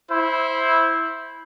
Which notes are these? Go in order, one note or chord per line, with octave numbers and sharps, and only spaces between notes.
E4 C5